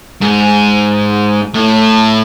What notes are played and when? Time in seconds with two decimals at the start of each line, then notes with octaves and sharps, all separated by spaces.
0.22 G#2
1.54 A2